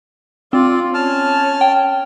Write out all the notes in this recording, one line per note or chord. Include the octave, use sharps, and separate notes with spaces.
C4 F4 D5
C#4 A5 F6
G5